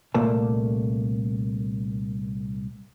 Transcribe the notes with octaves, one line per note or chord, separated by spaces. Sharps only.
C2 A#2 A3 A#3 A5